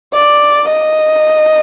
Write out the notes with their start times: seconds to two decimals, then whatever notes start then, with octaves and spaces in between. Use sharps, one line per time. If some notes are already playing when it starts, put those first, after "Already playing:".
0.14 D5
0.69 D#5